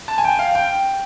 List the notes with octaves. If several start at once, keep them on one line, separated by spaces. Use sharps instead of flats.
A5
G#5
G5
F5
G5